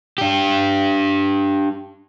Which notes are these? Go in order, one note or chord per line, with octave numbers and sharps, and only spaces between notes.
D4 G4